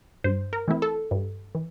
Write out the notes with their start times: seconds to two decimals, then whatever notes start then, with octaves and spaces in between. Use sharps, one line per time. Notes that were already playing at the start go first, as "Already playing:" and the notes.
0.24 G2 C5
0.53 A#4
0.68 E3 A3 C4 E4
0.82 A4
1.11 G2
1.55 E3